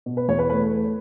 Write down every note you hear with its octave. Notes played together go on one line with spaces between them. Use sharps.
B2
B4
E2 C#5
B4
A3 B4